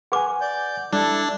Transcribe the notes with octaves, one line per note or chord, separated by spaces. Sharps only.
G#4 B4 F#5 G#5 D6
D5 G6
G3 D4 E4 A4